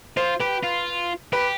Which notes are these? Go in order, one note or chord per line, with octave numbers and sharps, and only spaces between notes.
F4 C5
G4 B4
F4
G4 B4